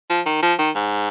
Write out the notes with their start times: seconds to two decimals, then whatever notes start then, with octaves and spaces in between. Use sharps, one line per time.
0.10 F3
0.26 D#3
0.42 F3
0.59 D#3
0.75 G#2